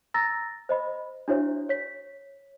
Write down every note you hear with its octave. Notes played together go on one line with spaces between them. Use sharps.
A#5 E6 A6 A#6
C5 D#5 B5
D4 E4 F#4 C5 C#5 E5
C#5 B6